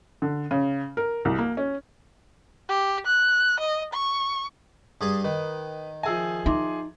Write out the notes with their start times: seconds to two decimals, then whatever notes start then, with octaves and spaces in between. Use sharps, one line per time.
0.22 D3
0.51 C#3
0.97 A#4
1.25 C2
1.39 A#3
1.57 C#4
2.69 G4
3.06 F#6
3.59 D#5
3.94 C#6
5.01 G2 G#4 A5 D#6
5.24 D#3 B4
6.03 F3 G#4 E5 G#5 E6
6.46 D#4 E5 C6 D6